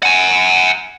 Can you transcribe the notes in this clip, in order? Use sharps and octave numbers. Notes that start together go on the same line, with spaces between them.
F#5 G#5